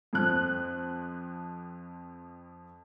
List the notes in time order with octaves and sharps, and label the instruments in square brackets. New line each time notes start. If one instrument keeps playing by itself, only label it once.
[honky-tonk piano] F2 F3 F#6